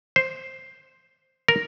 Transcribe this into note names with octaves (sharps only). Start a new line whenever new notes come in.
C5
A#4